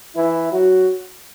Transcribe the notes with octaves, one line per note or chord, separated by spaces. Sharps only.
E3 E4
F#3 F#4